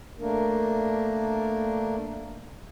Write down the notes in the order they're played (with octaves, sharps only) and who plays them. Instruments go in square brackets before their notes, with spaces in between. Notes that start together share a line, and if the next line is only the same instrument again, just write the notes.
[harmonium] A3 A#3 D4 A#4